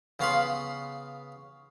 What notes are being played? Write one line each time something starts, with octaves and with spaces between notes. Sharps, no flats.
C#3 B3 F5 B5 C6